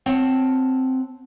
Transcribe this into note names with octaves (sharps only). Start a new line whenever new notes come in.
C4 C#5 F#5 A5